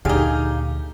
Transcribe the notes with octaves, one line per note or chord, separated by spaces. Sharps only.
D2 A#2 D3 D#4 G4 G#4 F5